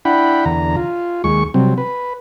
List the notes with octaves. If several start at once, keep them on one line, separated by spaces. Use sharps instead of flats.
D4 E4 F#5 G5 B5
E2 D3 A#5
F4
D#2 G#3 C#6
C3 F#3 G3 C4
B4